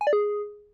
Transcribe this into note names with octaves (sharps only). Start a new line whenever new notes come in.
G#5
D5
G#4